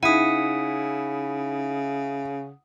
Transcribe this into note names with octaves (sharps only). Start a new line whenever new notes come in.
C#3 D#4 E4 F#5 D#6 B6 D#7